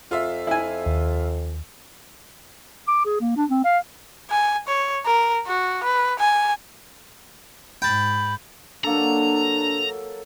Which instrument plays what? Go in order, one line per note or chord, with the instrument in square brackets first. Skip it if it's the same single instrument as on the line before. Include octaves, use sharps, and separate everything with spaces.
[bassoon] F2 [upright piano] F4 E5
[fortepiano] E4 G#5
[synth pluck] D#2
[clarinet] D6
G#4
A#3
D4
C4
F5
[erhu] G#5
C#5
A#4
F#4
B4
G#5
[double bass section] G#2 [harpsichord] G5 A5 [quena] B5
[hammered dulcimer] F#3 A#3 A4 [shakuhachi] D4 [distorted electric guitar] A#5